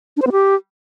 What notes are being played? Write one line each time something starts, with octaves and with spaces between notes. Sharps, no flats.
D4
C5
B3
G4